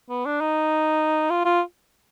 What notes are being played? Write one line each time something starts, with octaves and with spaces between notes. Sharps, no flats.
B3
D4
D#4
F4
F4